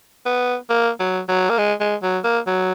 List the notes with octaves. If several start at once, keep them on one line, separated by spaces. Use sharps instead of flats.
B3
A#3
F#3
F#3
A#3
G#3
G#3
F#3
A#3
F#3